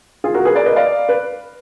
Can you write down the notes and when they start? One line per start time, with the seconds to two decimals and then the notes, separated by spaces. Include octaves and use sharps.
0.24 F4 G#4
0.34 F#4 A#4
0.45 G#4 B4
0.56 A#4 D5
0.66 B4 D#5
0.76 D5 F5
1.09 B4